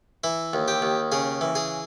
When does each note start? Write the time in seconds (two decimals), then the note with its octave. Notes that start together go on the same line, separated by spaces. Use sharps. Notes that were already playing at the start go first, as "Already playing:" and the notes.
0.24 E3 E4
0.53 D#2
0.68 G4
0.82 D#2
1.12 C#3 G#4
1.41 E3
1.55 G#4